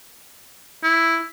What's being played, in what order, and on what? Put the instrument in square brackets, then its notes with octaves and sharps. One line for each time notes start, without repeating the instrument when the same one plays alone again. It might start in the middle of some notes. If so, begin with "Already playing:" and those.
[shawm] E4